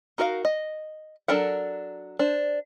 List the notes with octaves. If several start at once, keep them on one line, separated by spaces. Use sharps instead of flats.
D#4 F#4 A#4 D5 F5
D#5
F#3 D4 A4 A#4 F#5
D4 C5